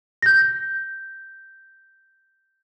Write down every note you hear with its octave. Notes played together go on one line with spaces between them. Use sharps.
G6 A#6